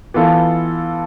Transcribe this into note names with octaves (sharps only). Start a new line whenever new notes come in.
E3 B3 F4 A4